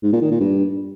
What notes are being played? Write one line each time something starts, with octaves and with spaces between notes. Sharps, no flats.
G#2
A#2
D#3
A#2
G2